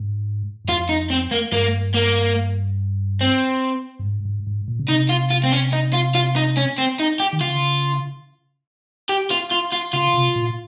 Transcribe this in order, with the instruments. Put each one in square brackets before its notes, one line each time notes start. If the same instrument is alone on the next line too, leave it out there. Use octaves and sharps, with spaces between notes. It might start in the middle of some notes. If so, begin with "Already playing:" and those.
Already playing: [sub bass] G#2
G2
[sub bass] F2 [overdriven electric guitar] F4
[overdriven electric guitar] D#4
C4
A#3
[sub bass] G2 [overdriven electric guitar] A#3
[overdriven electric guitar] A#3
C4
[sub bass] G2
G#2
G#2
G#2
A#2
C#3
[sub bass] C3 [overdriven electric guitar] D#4
[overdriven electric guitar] F4
F4
C4
C#4
D#4
F4
F4
D#4
C#4
C4
D#4
G4
[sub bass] D#3
[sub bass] C#3 [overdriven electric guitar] F4
[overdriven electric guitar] G4
F4
F4
F4
[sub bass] C#3 [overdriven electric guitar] F4
[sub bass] C3
A#2